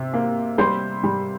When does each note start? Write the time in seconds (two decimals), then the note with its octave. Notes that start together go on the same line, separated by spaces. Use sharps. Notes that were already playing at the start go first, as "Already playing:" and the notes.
Already playing: C3
0.13 A#3
0.58 G3 C5 C6
1.03 G3